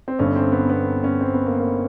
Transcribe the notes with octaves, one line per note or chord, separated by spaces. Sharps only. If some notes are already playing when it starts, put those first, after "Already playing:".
C4
G1 G2 D3 C#4
C4
B3
B3
C#4
C4
B3
A#3
A#3